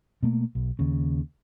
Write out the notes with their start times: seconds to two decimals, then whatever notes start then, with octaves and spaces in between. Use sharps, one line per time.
0.23 B2 A3 A#3
0.55 B1
0.79 D#2 C#3